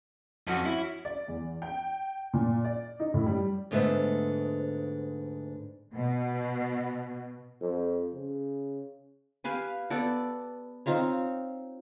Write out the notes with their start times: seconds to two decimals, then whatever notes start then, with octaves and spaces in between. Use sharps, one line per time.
0.47 F2 C#4 F#4
0.66 E4
1.05 D5
1.28 E2
1.62 G5
2.34 A#2
2.65 D5
3.00 D#4
3.14 A2
3.26 G3
3.71 D2 G#2 D3 B3 E5
5.95 B2
7.61 F2
8.14 C#3
9.44 G4 B4 F5 G#5
9.90 B3 A4 D5
10.86 C4 D#4 F4 C#5